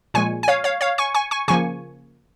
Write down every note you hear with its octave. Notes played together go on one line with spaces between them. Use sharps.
A#2 F3 G#3 G#5 C#6
G#5
C#5 F5
C#5 F5
C#5 F5
G#5 C#6
G#5 C#6
G#5 C#6
C#3 F3 A#3 G#5 C#6